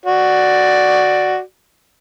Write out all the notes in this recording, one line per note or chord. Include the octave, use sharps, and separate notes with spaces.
F#4 D5